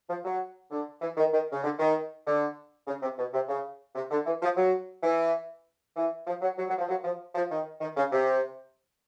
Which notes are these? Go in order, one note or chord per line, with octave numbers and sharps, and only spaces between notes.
F3
F#3
D3
E3
D#3
D#3
C#3
D3
D#3
D3
C#3
C3
B2
C3
C#3
C3
D3
E3
F3
F#3
E3
E3
F3
F#3
F#3
F#3
F3
F#3
F3
F3
D#3
D#3
C#3
C3